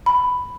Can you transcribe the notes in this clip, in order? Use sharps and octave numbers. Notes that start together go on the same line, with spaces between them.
B5